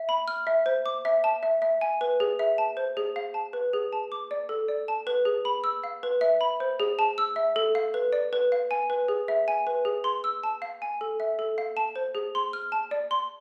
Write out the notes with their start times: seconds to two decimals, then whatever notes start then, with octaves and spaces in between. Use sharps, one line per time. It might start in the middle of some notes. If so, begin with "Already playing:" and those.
Already playing: E5
0.09 B5
0.28 F6
0.47 E5
0.66 C5
0.86 D6
1.05 E5
1.24 A5
1.43 E5
1.62 E5
1.81 G#5
2.01 B4
2.20 G#4
2.39 E5
2.58 A5
2.77 C5
2.97 G#4
3.16 F5
3.34 A5
3.53 B4
3.73 G#4
3.93 A5
4.12 D6
4.31 D5
4.49 A4
4.68 D5
4.88 A5
5.07 B4
5.25 G#4
5.45 B5
5.64 E6
5.84 F5
6.03 B4
6.21 E5
6.41 B5
6.60 C5
6.80 G#4
6.99 A5
7.18 E6
7.36 E5
7.56 A4
7.75 F5
7.94 B4
8.13 D5
8.33 B4
8.52 F5
8.71 G#5
8.90 B4
9.08 G#4
9.28 E5
9.48 G#5
9.67 B4
9.85 G#4
10.04 C6
10.24 E6
10.43 A5
10.62 F5
10.82 G#5
11.01 A4
11.20 E5
11.39 A4
11.58 F5
11.77 A5
11.96 C5
12.15 G#4
12.35 C6
12.53 F6
12.72 A5
12.91 D5
13.11 C6